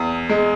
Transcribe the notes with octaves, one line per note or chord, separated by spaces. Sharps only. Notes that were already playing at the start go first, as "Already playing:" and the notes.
Already playing: E2
G#3